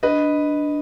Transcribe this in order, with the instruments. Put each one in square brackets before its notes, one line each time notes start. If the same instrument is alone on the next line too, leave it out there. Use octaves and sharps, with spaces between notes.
[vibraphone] D4 [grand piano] B4 D#5